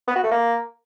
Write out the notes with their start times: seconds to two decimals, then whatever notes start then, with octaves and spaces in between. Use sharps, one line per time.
0.07 B3
0.15 F#4
0.23 A3
0.31 A#3